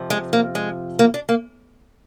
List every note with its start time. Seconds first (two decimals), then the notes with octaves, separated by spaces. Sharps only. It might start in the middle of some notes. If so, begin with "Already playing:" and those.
Already playing: F2 C3 F3
0.10 G#3
0.33 A#3
0.55 G#3
0.99 A#3
1.14 D4
1.29 A#3